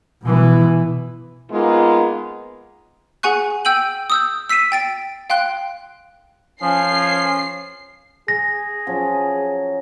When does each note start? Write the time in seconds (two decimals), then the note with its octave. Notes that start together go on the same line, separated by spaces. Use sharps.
0.22 B2 E3
1.51 G#3 A#3 B3 D#4 F4
3.23 G#4 F#5 G#5 C#6 F#6
3.65 G5 E6 G6 D#7 F#7
4.10 D#6 E6 G6
4.49 E6 B6 C7 D#7 E7
4.72 G5 A6 D7
5.30 F5 G5 C6 F#6
6.62 F3 C#4 G#5 C7
8.28 G#4 A#6
8.87 F3 F#3 C#4